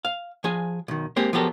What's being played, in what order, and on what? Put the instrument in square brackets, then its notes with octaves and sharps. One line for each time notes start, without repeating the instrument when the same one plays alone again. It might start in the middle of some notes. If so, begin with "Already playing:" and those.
[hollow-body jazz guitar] F5
F3 G#4 G#5
B1 D#3
G#3 A#3 C4 G4 G#4
F3 F#3 B3 G4 A4 A#4